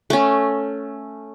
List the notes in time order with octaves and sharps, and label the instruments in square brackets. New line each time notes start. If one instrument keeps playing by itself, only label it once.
[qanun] A3 C#4